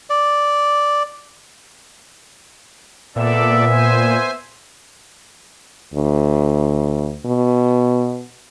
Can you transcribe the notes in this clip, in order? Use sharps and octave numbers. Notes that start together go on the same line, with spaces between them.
D5
A#2 B3 A4 D5 E5
C5 G#5
D2
B2